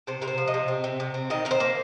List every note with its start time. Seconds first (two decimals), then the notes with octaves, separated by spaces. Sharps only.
0.07 C3 C5
0.22 C3 A#4
0.28 C5
0.38 F3
0.48 D#5
0.54 C3
0.68 C4
0.84 C3
1.00 C3
1.14 C4
1.30 D#3 D#5
1.45 D#3 A#4
1.51 C5
1.60 A#3